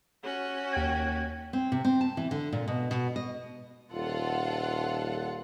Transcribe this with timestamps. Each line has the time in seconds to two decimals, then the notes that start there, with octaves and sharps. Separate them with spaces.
0.24 C#4 F#4
0.73 D#2 G5 G#6
1.53 C4
1.72 C3
1.85 C4
2.01 A5
2.17 E3
2.31 D3
2.52 A#2
2.68 B2
2.91 B2
3.16 D#5
3.93 D#1 F4 A4 F#5